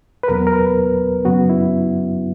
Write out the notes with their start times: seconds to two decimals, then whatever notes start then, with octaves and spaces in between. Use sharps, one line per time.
0.23 B4
0.28 E2 B2 F#3 B3 A#4
0.47 A#4
0.53 B4
1.25 F#2 C#3 F#3 B3 F#4
1.49 E4